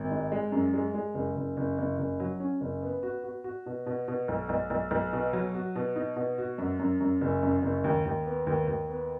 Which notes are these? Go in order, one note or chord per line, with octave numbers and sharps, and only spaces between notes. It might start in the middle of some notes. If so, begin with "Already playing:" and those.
Already playing: G#1
G#2
G#3
F#2
G#3
G#3
F#1
F#1
F#1
F#1
F#1
F#3
C#4
F#1
B3
F#4
F#4
F#4
B2
B2
B2
B1
B1
B1
B1
B2
F#3
F#4
B2
D#4
B2
F#4
F#2
F#2
F#2
F#1
F#2
F#1
D#2
D#2
B3
D#2
D#2
B3